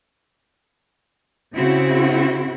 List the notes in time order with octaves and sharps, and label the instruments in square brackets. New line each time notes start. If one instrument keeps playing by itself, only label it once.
[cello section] C#3 C4 E4 F#4